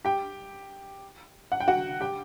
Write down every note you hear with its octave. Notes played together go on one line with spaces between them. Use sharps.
G4 G5
F#5
G5
F#4 F#5
G4 G5